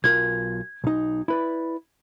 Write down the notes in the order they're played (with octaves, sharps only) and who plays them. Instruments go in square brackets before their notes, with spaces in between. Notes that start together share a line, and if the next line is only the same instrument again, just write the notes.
[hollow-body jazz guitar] B1 F4 A#4 [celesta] G#6
[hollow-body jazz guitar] B1 D#4
E4 B4 D5